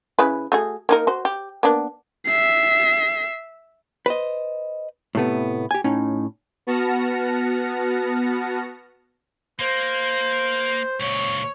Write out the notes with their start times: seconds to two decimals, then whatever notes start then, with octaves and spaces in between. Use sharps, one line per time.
0.19 C#3 E4 B4
0.52 A3 F#4 G#4
0.89 A#3 D#4 A#4
1.07 F#4 C5
1.25 G4
1.63 A#3 B3 D4
2.26 E5 C7
4.06 B4 C5 D#5
5.15 A2 C3 A3 B3
5.71 G4 G#5
5.84 A2 C#4 D#4
6.67 B3 F#4 A5 F6 A#6 C#7
9.59 A#3 C5
11.00 C#2 A#2 C#5